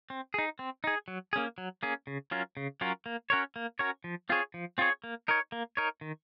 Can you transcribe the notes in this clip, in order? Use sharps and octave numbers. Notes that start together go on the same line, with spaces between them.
C4
D#4 G#4
C4
D#4 G#4
F#3
A#3 C#4 G#4
F#3
A#3 C#4 G#4
C#3
F#3 C#4 F4 A#4
C#3
F#3 C#4 F4 A#4
A#3
C#4 F#4 A#4 C#5
A#3
C#4 F#4 A#4 C#5
F3
C4 F4 G#4 C#5
F3
C4 F4 G#4 C#5
A#3
D#4 A#4 C#5
A#3
D#4 A#4 C#5
D#3